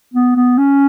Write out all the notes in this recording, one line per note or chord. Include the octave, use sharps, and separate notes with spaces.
B3
B3
C#4